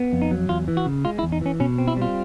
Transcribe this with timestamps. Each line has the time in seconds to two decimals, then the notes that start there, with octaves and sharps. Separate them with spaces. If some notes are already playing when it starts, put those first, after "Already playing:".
Already playing: B3
0.13 F2
0.22 D#4
0.31 F#3
0.49 E2 F4
0.68 E3
0.77 F#4
0.86 C#3
1.05 G#3 F4
1.19 E4
1.23 E2
1.32 D#4
1.41 E3 C#4
1.60 B2 C#4
1.78 C4
1.88 E4
1.97 G3 F4